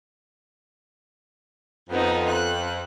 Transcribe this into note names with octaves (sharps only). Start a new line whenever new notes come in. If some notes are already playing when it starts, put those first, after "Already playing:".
F2 B3 D#4
F#6